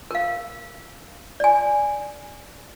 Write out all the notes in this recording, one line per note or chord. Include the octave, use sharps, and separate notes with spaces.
A#4 F5
D5 G#5